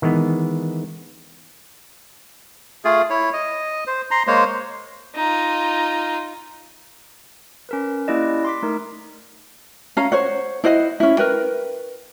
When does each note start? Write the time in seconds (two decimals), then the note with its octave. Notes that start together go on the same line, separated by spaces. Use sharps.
0.02 D#3 E3 G#3 B3
2.85 A3 F4 G#4
3.10 E4 C#5
3.33 D#5
3.87 C5
4.11 A#5 C6
4.27 G#3 A#3 C5 C#5
5.15 D#4 F4
7.69 C#4 A#4 B4
8.08 A#3 C#4 E4 G4 D5 D#5
8.45 C6 D6 B6
8.62 A3 D#4 A#4
9.97 C#4 F5 A#5
10.12 C5 C#5 F#5
10.64 E4 C5 D#5 F#5
11.00 C#4 E4
11.18 A#4 B4 G5